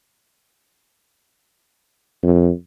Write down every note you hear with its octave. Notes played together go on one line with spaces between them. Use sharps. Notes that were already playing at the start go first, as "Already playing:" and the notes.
F2